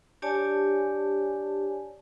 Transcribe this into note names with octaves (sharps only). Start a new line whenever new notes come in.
D4 G4 C#5 D5 G#5 A5